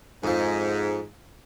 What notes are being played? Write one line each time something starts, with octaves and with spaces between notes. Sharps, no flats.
F2 G#2 F3